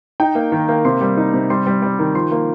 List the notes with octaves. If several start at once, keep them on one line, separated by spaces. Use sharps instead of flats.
D#4 G5
A#3
D#3
A#3
C3 C6
G3
D#4
C3
G3 C6
G3
G3
D#3
F3 C6
A#3